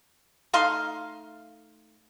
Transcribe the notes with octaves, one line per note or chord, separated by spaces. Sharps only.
A3 D#4 F5 C6